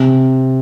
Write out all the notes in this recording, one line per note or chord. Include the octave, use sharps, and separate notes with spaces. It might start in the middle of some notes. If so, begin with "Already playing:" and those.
Already playing: C3